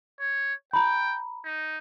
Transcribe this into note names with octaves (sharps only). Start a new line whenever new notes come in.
C#5
G5 A#5 B5
D#4